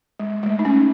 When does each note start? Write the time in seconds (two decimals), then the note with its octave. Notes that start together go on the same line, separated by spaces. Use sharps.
0.20 G#3
0.43 G#3
0.46 A3
0.59 D#4
0.65 C#4